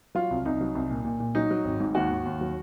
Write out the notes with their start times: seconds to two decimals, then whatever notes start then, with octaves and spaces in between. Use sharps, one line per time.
0.15 F#3 F4
0.31 C2
0.45 C2 D#4
0.61 F#3
0.75 C2
0.90 A#2
1.05 A#2
1.20 A#2
1.35 F#3 D#4
1.51 F#3
1.65 G#1
1.80 G#2
1.95 D#2 F#4
2.10 D#2
2.25 D#2
2.41 F#3